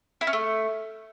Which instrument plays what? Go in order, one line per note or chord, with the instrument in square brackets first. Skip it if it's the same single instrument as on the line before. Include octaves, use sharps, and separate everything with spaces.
[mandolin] E4
C#4
A3